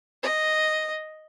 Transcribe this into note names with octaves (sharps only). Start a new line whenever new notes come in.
D#5